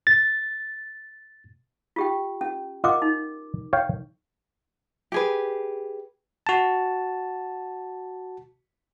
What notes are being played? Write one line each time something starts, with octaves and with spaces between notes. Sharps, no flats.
A6
F4 G4 G5
C#4
F4 A#4 D#5 F#5 D6
D#4
C#5 F5 G5
G4 G#4 B4
F#4 A5